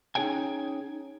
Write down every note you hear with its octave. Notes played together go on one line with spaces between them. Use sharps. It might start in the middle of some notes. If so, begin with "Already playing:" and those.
C#4 D#4 G#4 C#5 G5 G#5